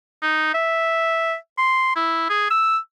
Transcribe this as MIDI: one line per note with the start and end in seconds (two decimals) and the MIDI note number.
0.22 0.51 63
0.54 1.36 76
1.58 1.95 84
1.96 2.29 64
2.30 2.49 68
2.51 2.78 88